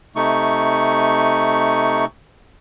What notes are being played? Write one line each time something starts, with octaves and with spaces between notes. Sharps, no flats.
C3 A3 D#4 C#6